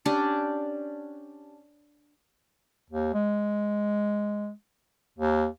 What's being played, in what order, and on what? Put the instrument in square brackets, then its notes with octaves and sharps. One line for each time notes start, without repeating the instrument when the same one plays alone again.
[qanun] C#4 D4 G4
[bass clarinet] D#2
G#3
D#2